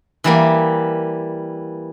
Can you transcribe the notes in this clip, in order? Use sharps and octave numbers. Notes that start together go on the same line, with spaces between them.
E3 G3 A#3